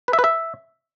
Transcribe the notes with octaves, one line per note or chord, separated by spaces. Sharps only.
B4
E5
B4
E5